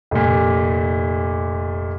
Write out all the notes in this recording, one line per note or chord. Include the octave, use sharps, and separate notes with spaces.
F1 A#2